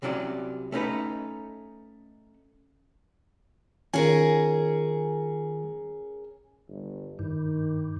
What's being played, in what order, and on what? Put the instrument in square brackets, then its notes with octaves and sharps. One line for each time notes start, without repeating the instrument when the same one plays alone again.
[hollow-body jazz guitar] C2 C3 F#3 C#4 D5
A3 C#4 D#4 B4
[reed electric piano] D#3 F4 G#5 [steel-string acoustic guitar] C#4 G#4 A#4
[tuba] G1
[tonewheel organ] G2 [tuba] D#3